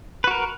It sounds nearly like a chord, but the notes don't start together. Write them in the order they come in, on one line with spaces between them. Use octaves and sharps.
B4 F#4 A#4